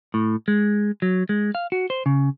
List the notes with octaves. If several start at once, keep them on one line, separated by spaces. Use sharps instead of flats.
A2
G#3
F#3
G#3
F5
F#4
C5
C#3